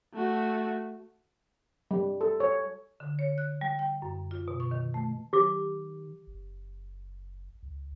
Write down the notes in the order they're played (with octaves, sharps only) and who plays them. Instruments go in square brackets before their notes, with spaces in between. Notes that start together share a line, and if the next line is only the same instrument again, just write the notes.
[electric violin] A3 F#4
[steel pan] G3
A4
C#5
[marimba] D3
C#5
F#6
G3
G5
F#2
F4
B2
C#6
D#3
A3
[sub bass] D#3 [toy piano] G4 D6
[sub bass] F#1
C#2